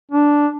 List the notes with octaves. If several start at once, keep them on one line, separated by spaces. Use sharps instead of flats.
D4